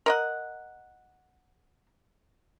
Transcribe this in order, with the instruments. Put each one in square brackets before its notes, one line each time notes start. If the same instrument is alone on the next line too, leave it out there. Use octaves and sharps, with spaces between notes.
[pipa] A#4 D#5 F#5